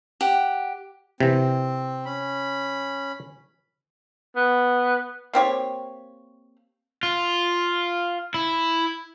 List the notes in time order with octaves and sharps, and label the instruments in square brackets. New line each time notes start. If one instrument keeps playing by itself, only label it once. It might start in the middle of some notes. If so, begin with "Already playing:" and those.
[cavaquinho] G4 F#5
[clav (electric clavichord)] C3 E3 [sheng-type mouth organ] C4
[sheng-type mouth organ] C#4 B5
[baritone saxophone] B3
[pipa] A#3 C4 G4 C#5
[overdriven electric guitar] F4
E4